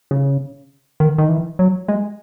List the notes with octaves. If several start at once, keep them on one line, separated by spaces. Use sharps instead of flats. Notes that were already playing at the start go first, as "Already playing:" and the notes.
C#3
D#3
D#3
E3
F#3
G#3